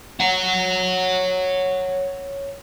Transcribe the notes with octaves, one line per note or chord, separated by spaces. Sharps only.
C#5 F#5